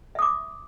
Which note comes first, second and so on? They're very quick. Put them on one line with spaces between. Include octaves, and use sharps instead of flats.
E5 D#6 D6